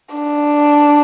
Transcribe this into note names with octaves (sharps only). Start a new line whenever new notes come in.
D4